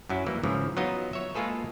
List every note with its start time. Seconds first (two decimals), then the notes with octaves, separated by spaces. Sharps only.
0.09 F#2 F#3 E4
0.26 E3 G3 A#3
0.43 G#2 C#3 E3 F3
0.77 F#3 B3 D#4 F4 D#5
1.13 C#5 E5
1.35 G#3 A#3 F4 G#4 A4 B4